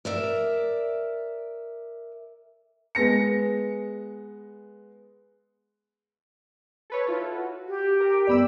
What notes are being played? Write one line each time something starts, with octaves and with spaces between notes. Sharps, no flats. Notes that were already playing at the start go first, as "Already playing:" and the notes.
A#4 D5 E5
G#3 B3 A#6 C#7
A4 B4 C#5
E4 F4 A4
F#4
G4
A#4
G1 B3 D5 B5 E6